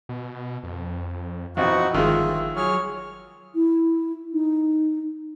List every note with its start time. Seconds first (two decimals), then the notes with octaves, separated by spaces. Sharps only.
0.09 B2
0.64 F2
1.57 A#1 B2 E3 C4 D#4 F#4
1.94 G1 D#3 F3 G#3 F4 E5
2.56 F#3 G#4 C#5 F6
3.55 E4
4.33 D#4